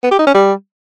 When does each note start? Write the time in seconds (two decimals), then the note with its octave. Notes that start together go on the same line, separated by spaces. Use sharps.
0.04 B3
0.11 G4
0.19 D#4
0.27 C#4
0.35 G3